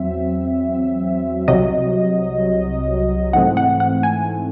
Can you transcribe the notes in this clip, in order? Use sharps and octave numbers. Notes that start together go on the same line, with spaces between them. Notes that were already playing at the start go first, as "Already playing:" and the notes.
Already playing: E2 F#3 C4 E5
C2 C3 F#3 D#5
G#2 E3 A3 C4 F#5
F#5
F#5
G#5